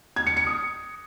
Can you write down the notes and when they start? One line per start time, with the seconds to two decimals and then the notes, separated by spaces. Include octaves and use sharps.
0.16 G#6
0.27 C#7
0.37 C#7
0.47 D#6